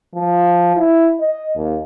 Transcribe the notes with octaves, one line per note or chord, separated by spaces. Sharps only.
F3
E4
D#5
D#2